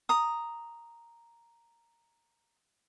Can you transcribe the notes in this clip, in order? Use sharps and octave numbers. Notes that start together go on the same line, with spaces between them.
A#5 D#6